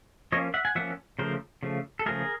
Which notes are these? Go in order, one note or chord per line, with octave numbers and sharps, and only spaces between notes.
F3 A#3 C#4 C#5 D#5
E5 F#5
F#5 G#5
F3 A#3 C#4 E5 F#5
C#3 F3 A3 A#4 C5
C#3 F3 A3
A4
C#3 F3 A3 G#4 A#4